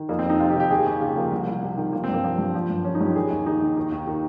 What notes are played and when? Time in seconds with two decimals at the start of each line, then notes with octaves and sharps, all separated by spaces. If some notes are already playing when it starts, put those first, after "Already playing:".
Already playing: D#3
0.09 F2 A#3
0.19 C4
0.25 F2 D#4
0.40 C3 F4
0.50 G4
0.55 D#3
0.60 G4
0.70 D#2 G#4
0.85 D#2 G4
1.01 C#3 F4
1.16 F3 A#3
1.31 C2
1.47 C2
1.62 C3
1.77 D#3
1.93 F3 A#3
2.04 G2 C4
2.14 A#3
2.24 F3 A#3
2.38 G2
2.54 F3
2.70 G2
2.84 F3 C#4
2.95 D#4
3.01 G2 G4
3.16 D#3 G#4
3.31 D#2
3.46 D#3 D#4
3.61 D#2
3.77 D#3
3.92 D#2
4.07 D#3